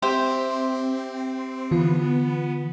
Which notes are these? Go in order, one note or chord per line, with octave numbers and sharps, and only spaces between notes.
C4 G4 C5 E5
D3 E3 B3 F4